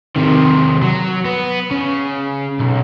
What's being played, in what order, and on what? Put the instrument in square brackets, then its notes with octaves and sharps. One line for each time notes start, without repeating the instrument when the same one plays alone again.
[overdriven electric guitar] C3 D#3
F#3
B3
C#3
B1